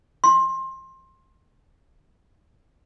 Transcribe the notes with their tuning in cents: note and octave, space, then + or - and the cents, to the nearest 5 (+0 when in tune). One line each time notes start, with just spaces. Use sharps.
C6 +20